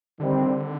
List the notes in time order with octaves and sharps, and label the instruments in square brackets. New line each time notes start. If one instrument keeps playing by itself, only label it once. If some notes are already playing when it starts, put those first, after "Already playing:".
[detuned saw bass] D3 [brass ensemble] D#3 G3 C4